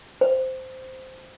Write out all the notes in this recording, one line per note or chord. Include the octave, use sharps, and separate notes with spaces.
C5